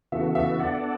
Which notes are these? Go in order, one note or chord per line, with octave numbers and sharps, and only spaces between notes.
C#3 E3 B3 F#4 A4 E5
E5
B3 D4 A4 D5 F#5